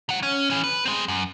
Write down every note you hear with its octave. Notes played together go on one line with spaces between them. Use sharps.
D#3 F#5
C#4
E3 C#4
B4
G#3 C4
F#2